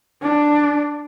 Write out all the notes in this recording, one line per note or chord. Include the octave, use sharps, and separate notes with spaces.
D4